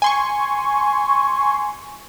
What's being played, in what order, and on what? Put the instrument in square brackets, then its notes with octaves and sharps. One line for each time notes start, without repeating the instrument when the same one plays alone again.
[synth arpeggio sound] G#5 C6 C#6